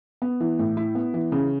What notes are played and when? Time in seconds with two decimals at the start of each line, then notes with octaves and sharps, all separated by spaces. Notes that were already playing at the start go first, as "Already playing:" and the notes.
0.22 B3
0.40 E3
0.59 A2
0.77 E4
0.95 B3
1.14 E3
1.32 C#3